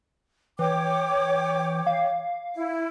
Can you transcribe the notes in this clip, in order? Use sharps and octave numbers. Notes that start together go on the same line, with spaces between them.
E3 C#5 G5 D6
F5
E4